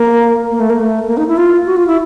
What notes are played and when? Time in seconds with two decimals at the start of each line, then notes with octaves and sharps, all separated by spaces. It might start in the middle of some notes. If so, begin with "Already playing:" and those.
Already playing: A#3
0.51 A#3
0.60 A3
0.70 A#3
0.79 A3
1.08 A#3
1.17 D#4
1.28 E4
1.37 F4
1.66 F#4
1.76 F4
1.87 E4